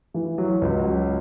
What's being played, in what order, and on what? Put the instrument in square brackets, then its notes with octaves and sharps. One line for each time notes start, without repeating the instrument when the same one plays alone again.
[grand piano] E3
F#3
C#2
F#3